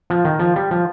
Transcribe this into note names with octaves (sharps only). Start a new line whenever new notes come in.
F3
D#3
F3
G3
F3